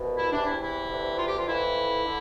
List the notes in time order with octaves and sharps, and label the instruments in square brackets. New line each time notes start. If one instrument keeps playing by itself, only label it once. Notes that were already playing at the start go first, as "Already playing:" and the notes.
Already playing: [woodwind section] C2 B2
E4
E2 C3 E3 D4
E4
E4
D2 C3 E3
F4
G4
F4
F2 E3 E4
D3